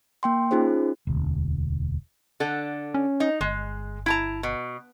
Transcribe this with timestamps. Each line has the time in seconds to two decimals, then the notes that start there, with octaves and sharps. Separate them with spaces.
0.23 A#3 G5 C6
0.51 C#4 D#4 F4 G#4 C5
1.07 E1 D2
2.40 D3 A4
2.94 C#4
3.20 D#4
3.41 G1 G#3
4.06 E4 A5 A#5
4.43 B2